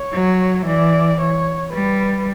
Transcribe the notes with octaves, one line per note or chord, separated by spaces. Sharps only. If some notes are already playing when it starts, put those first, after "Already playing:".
Already playing: C#5
F#3
E3 D5
C#5
G3 B4